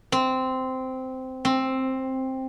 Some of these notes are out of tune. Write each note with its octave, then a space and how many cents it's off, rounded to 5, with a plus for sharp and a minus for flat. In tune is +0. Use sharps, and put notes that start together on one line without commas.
C4 -10
C4 +10